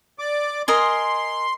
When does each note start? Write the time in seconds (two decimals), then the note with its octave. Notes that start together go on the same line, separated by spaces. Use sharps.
0.19 D5 D6
0.68 A#4 D#5 G#5 C6